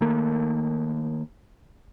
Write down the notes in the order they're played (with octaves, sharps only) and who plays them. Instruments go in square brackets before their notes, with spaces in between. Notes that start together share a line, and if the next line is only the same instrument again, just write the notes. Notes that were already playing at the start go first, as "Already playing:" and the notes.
[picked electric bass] D#3 A3 A#3